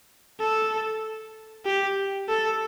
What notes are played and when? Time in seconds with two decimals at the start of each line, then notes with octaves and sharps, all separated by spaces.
0.40 A4
1.66 G4
2.29 A4